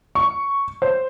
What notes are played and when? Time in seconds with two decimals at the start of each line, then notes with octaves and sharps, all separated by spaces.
0.15 C#6
0.82 C5